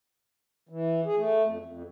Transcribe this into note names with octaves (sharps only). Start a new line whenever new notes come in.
E3
G#4
A3
F2
F2